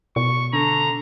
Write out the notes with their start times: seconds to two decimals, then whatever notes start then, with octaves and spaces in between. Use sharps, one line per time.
0.16 B2 C#6
0.53 D3 A#5